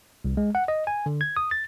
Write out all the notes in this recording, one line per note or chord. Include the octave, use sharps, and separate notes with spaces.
C2
G#3
F#5
D#5
G#5
D3
G#6
D#6
A6